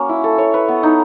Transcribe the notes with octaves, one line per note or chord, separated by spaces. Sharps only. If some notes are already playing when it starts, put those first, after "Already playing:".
Already playing: A#3 C#4 F#4
E4
A4
C#5
B4
B3
D#4